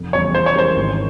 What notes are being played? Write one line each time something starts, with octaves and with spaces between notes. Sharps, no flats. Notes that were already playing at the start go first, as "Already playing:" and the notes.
Already playing: F1
E2 C#3 G3 C4 C#5
E3 C5
C#5
G#3 C#4 G4 A#4 C5
G#1